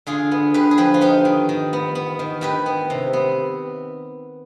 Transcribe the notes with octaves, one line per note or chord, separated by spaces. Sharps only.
D3 F4 G#4
B3
D3 G4 B4
G#4
F3 G4 B4
F4
B3 D#4 G4
D#3
D#3
B3
B3
D#3
D#3 G4 B4
B3
C3
B3